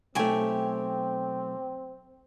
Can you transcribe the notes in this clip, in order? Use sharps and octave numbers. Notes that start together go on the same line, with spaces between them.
B1 A3 C4 G4 C#5 G#5